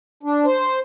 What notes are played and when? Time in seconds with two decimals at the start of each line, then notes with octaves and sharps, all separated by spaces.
0.23 D4
0.45 C5